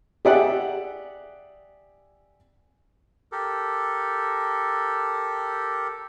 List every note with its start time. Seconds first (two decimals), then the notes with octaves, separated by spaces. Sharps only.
0.25 G4 G#4 D5 E5 F#5
3.32 G4 A4 A#4